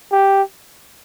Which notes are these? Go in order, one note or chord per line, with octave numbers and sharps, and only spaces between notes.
G4